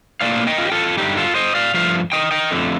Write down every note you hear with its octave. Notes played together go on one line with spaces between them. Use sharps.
A2 G3 A#3 D4 D5 F5
D#5 G5
F4
G4
F4 A4
G2 D3 G3 D#4 G4
F4 A4
C5 D#5
D5 F5
G2 F3 A3 F5
D#5 G5
D#5 G5
F2 D3 A3